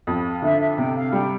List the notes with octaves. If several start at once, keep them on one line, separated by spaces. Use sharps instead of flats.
F2 G4
F5
D3 E5
E5
C3 G5
F5
G3 G5